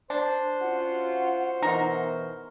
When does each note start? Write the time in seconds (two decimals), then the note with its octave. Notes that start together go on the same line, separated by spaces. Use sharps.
0.10 D4 C5
0.60 C#4 F4 F#4 F#5
1.62 B2 E3 D#4 F#4 A#4